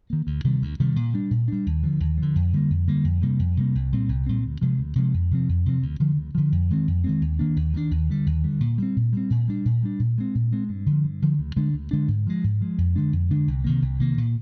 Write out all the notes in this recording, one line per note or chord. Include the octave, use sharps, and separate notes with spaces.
D#3 A#3
D2
C3 D#3 G3
D2
C3 D#3 G3
A#2
G3 D4
A#2
G3 D4
D#2
D3 F3
D#2
D3 F3
F2
D3 G3 A#3
F2
D3 G3 A#3
F2
C3 G3 A#3
F2
C3 G3 A#3
C2
A#2 G3 C4
C2
A#2 G3 C4
D2
C3 F3 G#3
D2
C3 F3 G#3
F2
C3 F3 C4
F2
C3 F3 C4
D2
D3 F3
D2
D3 F3
F2
D#3 G#3 C4
F2
D#3 G#3 C4
D#2
D#3 A#3 D4
D#2
D#3 A#3 D4
D#2
D3 G3
D#2
D3 G3
A#2
G3 C4
A#2
G3 C4
A#2
G3 D4
A#2
G3 D4
A#2
G#3 C4
A#2
G#3 C4
G2
D3 F3
G2
D3 F3
D2
D3 G#3 D4
D2
D3 G#3 D4
G#2
F3 G#3
G#2
F3 G#3
F2
D3 G#3 D4
F2
D3 G#3 D4
C2
C3 D#3 A#3
C2
C3 D#3 A#3
A#2